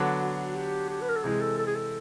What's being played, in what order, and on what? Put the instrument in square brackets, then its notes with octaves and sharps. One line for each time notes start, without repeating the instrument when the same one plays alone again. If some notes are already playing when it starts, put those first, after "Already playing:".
Already playing: [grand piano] D3 F#3 B3 D4
[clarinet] F#4
G4
G4
B4
A#4
A4
[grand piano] C3 E3 G#3 [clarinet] G#4
[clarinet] A4
A4
G#4
A4